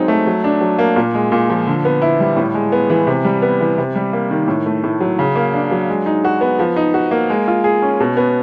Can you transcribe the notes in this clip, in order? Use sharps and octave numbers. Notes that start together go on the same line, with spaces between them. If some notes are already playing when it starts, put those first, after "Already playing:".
Already playing: F#3 G#3 C4 D#4
A3
F#3
D4
F#3
A#3
A#2
G#3
A#2
F3
D3
B3
E4
G3
A2
G#3
B3
E3
C3
G3
B3
E3
C3
G3
A#3
D#3
A2
A3
A2
F#3
C#3
A#3
D4
F#3
G#3
D#4
F#4
B3
F3
D#4
F#4
A#3
G#3
F4
G#4
C#4
B2
B3